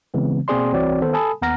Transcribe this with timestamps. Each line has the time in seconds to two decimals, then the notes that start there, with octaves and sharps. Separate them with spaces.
0.14 C#3 E3 G#3 B3 C4
0.48 B2 A#3 C4 G#4 D5 C6
0.72 C2 E3 C4 F#4 C#5 D5
1.01 D#3 B3 A4 C5
1.14 A4 G#5 A5 B5 D#6
1.42 D#2 B3 F#5 A#5 F6 A#6